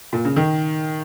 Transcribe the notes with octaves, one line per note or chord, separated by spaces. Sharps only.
A#2
C#3
D#3